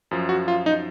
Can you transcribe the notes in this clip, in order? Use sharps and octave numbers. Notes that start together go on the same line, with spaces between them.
F#2 F3
F#4
F4
D#4